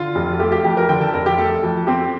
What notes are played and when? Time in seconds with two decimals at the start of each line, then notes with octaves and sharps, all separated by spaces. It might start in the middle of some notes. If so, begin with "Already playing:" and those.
Already playing: D3 F4
0.15 F1
0.39 A3 G4
0.52 G4
0.64 F2 G4
0.77 A#4
0.89 D3 G5
1.01 A5
1.14 F1 A#4
1.26 G4
1.38 A3 A4
1.63 F2
1.87 C4 G4